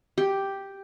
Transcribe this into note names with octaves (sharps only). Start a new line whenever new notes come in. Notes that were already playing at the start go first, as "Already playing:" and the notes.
G4